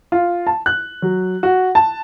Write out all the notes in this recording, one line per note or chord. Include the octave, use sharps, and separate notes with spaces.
F4
A5
F#6
F#3
F#4
A5